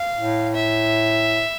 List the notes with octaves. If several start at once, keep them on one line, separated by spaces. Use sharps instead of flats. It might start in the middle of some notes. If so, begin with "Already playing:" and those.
Already playing: F5
A2
E5